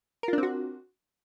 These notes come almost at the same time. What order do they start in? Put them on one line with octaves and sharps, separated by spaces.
A#4 F4 D4 C4 F#4